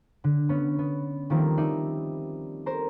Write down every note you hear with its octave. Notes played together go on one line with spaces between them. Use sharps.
D3
B3 C#4
B3
D#3 F3 G3 A#3 C4
D#4 D5 E5 C7
A#4 C5